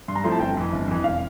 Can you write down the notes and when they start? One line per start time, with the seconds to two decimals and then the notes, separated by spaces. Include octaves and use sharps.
0.08 G2 C6
0.16 A#5
0.24 F3 A3 C4 E4 C6
0.32 A5
0.40 G1 G5
0.57 F2 E3
0.73 G1
0.88 F2 E3
1.04 E1 F5